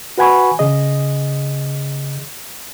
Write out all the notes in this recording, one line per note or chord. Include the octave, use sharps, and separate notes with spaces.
F#4 B4 F#5 G#5 B5 C#6
C#3 G#4 D#5